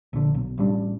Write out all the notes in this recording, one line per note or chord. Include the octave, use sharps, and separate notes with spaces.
A#1 D3
B1
A1 G3 D4